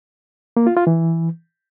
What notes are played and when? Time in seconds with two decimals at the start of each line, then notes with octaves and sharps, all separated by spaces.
0.57 A#3
0.67 F4
0.77 F4
0.87 E3